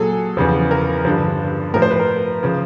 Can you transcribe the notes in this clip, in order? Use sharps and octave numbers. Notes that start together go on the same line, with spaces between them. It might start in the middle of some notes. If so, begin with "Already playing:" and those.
Already playing: A#2 F#3 G#4 A4
E2 C#3 F3
A#4
G2 D3 F3
A2 F3 A#4
C5
B4
A#4
C#3 F3